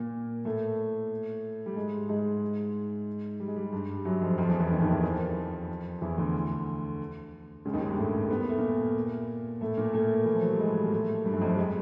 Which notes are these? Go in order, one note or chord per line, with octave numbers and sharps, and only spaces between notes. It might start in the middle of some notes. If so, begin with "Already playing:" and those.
Already playing: A#2 A#3
A2 A3
G3
G#2 G#3
G#2 G#3
G3
G#3
G3
G#3
G2 G3
F#2 F#3
F2 F3
F2 F3
E2 E3
E2 E3
D#2 D#3
D#2 D#3
E2 E3
F2 F3
E2 E3
D2 D3
C#2 C#3
D#2 D#3
G#2 G#3
G2 G3
A2 A3
B3
A#3
A3
A#2 A#3
A2 A3
A#2 A#3
A2 A3
E3
F3
F#3
G3
G#2 G#3
A#3
A2 A3
G2 G3
F#2 F#3
F2 F3
F#2 F#3
G#3